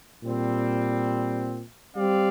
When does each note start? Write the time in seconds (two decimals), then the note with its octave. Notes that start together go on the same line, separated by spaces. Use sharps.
0.22 A#2 G3 C4
1.95 G3 C4 G4 D5 F5